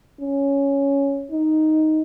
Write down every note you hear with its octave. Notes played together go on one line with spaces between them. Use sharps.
C#4
D#4